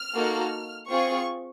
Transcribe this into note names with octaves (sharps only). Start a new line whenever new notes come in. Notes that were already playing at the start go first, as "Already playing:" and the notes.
Already playing: F6
A#3 D#4 F#4 A4
C4 F4 G#4 C#6